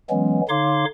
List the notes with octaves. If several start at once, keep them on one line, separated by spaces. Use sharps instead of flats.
E3 F#3 G#3 B3 C#4
D3 D#4 C#5 F5 C6 D6